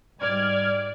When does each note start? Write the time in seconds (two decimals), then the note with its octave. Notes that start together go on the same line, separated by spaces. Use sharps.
0.20 G#2 G3 D5 F6 G#6